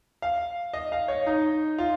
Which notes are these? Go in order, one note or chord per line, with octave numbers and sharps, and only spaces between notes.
F5
D#5
F5
C#5
D#4
F4